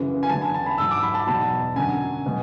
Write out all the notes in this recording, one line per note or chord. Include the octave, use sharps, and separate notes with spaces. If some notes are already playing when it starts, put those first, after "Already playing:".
Already playing: F#2 C#3 E3
G#5
E2 D3 F#3 A5
G#5
A5
B5
G#2 F#3 E6
D6
B5
A5
E2 B2 F#3 A5
F#2 D3 F#3 G#5
B2 F#3